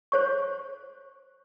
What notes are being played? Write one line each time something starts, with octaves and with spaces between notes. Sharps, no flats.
C5 C#5 C#6